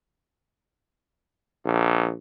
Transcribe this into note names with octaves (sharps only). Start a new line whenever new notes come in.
A#1